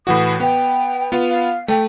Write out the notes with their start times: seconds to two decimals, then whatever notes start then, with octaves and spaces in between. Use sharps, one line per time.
0.07 A2 E3 F#4 D#6
0.40 B3 G5
1.12 B3 F4
1.30 F5
1.68 A3 G5